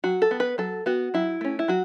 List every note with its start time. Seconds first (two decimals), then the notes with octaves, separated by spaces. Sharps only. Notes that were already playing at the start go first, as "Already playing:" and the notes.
0.04 F#3 F#4
0.22 A4
0.31 B3
0.40 B4
0.58 F#3 A4
0.86 B3 F#4
1.14 F#3 E4
1.41 A3 C#4
1.59 E4
1.68 F#3 F#4